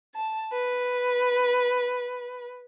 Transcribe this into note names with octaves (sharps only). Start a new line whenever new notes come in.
A5
B4